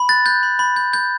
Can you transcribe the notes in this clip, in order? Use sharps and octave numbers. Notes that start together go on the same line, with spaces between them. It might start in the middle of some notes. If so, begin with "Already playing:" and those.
Already playing: B5
F#6 A6
F#6 G6
B5
B5
G6
G6